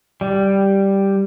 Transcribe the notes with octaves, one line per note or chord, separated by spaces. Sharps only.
G3